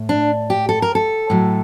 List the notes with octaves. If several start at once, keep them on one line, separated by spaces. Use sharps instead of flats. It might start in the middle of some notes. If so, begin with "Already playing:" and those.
Already playing: A2
D4
G4
A4
A#4
A4
A2 F#3